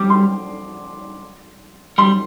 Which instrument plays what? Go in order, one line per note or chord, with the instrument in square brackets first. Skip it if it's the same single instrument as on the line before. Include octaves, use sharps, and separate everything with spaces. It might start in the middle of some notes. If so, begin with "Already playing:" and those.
Already playing: [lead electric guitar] G3 [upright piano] D6
[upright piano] C6
[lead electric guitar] G3 [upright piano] C6